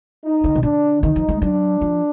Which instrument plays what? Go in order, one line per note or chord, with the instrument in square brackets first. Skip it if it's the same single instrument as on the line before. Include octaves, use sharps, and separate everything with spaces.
[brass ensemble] D#4
[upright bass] D3
B2
[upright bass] D3 [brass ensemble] D4
[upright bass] D#3 [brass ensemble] D#4
[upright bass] F3
G#3
[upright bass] F#3 [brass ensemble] D4
[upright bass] F3